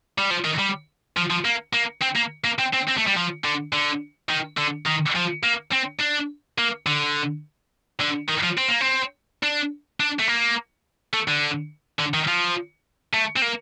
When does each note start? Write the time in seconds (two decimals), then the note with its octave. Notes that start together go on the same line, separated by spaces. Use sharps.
0.18 G3
0.31 F3
0.45 D#3
0.59 G3
1.17 F3
1.30 F3
1.45 A#3
1.73 A#3
2.02 C4
2.16 A#3
2.45 A#3
2.59 C4
2.73 C4
2.88 C4
2.97 A3
3.07 G3
3.16 F3
3.45 D3
3.73 D3
4.30 D#3
4.58 D3
4.87 D#3
5.16 F3
5.43 A#3
5.73 C4
6.00 D4
6.58 A#3
6.86 D3
8.00 D3
8.29 D#3
8.44 F3
8.58 C4
8.68 A#3
8.81 C4
9.43 D4
10.00 D4
10.20 A3
10.28 A#3
11.14 A3
11.28 D3
11.99 D3
12.14 D#3
12.28 F3
13.13 A3
13.36 C4
13.42 A#3